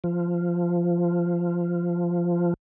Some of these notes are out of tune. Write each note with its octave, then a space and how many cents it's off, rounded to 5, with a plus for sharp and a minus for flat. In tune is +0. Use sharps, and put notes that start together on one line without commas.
F3 -10